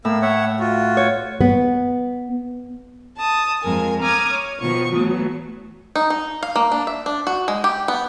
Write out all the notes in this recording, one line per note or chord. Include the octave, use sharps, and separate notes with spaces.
A2 A#3 E6
C#5 E5 F#5
F4 F#4
C#5
B3
A5 D#6
F2 G#3 A#4 G#5
A#5 D6 D#6 F6 G#6
C#5
B2 D#3 F3 B3 C#6
E3 F#3 A3 B3
D#4
D#4
F5
A#3
D4
E5
D4
F#4
G#3
G4
B3